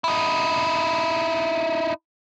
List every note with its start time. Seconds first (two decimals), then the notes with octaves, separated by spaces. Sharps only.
0.04 D#4 E4